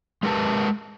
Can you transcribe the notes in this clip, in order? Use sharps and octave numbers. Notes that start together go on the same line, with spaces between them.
G#3 G4 A#4 B4 G5 A5